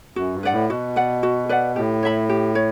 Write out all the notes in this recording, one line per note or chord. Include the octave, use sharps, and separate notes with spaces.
F#2 F#4
G2
B4 D5 F#5
A2
B2 F#4
B4 D5 F#5
F#4
B4 D5 F#5
A2 G4
C#5 E5 B5
G4
C#5